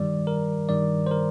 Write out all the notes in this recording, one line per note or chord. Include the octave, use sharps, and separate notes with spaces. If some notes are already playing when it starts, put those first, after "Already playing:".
Already playing: G2 D#3 G3 D5
A#4
G2 D#3 G3 D5
C5
A#4